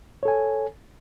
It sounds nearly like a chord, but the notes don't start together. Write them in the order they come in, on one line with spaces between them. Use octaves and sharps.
C#5 A4 G#5